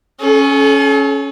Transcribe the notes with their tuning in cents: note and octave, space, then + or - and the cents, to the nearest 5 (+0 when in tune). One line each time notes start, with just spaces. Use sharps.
C#4 +0 A4 -40